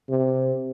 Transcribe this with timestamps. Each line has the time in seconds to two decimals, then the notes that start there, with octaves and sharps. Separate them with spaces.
0.09 C3